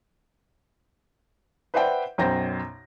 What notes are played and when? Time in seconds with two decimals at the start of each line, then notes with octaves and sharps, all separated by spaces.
1.74 B4 C5 D5 E5 F#5 G5
2.18 B1 F#2 C5 G5 A#6